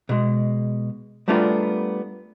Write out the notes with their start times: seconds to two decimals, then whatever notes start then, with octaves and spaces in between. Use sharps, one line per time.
0.09 B2 G#3
1.28 G3 A3 B3 D4 F4 A#4